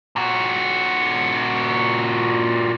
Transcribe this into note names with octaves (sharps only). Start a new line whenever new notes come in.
A#2 F#4